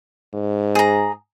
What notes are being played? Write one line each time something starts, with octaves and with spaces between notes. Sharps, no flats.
G#2
G#4 A#5